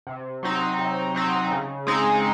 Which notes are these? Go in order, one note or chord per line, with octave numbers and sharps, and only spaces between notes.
C3
F#3 C4 D#4
C3
F#3 C4 D#4
C#3
G#3 C4 D#4